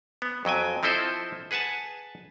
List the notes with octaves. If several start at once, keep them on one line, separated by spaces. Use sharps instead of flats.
B3
F2 F#3 G5 G#5
F3 C4 E4 A4 C5 D#5
G#4 B4 F#5 G#5 A5